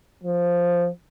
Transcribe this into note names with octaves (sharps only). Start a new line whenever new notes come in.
F3